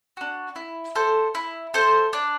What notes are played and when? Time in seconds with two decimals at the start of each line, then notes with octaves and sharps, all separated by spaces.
0.17 D4 F#4
0.56 E4
0.95 A4 C5
1.35 E4
1.74 A4 C5
2.13 D4